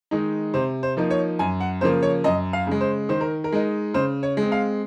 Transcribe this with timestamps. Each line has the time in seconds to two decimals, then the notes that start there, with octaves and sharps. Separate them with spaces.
0.11 D#3 G#3 D#4
0.54 C3 C5
0.83 C5
0.97 F3 A#3 D#4
1.10 C#5
1.39 F#2 G#5
1.60 F#5
1.81 C#3 F3 A#3 C5
2.02 C#5
2.24 F#2 D#5
2.53 F5
2.67 C#3 G#3
2.81 C5
3.09 D#3 C5
3.21 A#4
3.44 A#4
3.52 G#3 D#4
3.94 C#3 C5
4.23 C#5
4.37 G#3
4.42 C4
4.52 F5